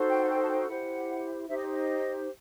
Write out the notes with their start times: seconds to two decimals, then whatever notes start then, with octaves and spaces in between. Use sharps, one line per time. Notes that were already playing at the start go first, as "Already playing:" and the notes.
Already playing: D#4 F#4 A4 C5
0.09 G5
0.25 F#5
0.28 G5
0.42 A5
0.49 G5
0.68 E4 G4 C5 F#5
1.48 D#4 G4 C5 E5
1.57 D#5
1.73 D#5